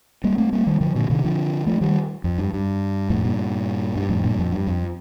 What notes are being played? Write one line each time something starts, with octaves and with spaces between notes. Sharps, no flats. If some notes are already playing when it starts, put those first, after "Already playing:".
G3 A#3
A3 C4
G3 A#3
D#3 G3
D3 F3
A#2 D3
C3 D#3
D3 F3
F3 A3
D#3 G3
F2
G2
G2
F2 A2
G2 A#2
G2
F2 A2
G2 A#2
F2
G2
F2